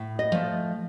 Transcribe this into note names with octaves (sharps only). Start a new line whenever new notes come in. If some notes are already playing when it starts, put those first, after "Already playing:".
Already playing: A2
D#5
F3 A3